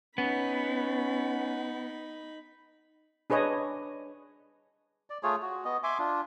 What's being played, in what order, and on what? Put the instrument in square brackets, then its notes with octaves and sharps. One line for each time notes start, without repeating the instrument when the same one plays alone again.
[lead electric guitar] B3 [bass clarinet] C#4 [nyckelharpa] D#4 B5
[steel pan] D4 G#4 B4 C#5 D#5
[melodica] D5
A3 F4 G#4 C#5
F#4
B3 D#5
E5 G#5 C6 D6
D4 F4